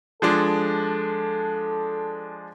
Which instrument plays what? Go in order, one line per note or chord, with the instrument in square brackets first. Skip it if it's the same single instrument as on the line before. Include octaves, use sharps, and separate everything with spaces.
[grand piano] F3 G#3 D4 [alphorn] A4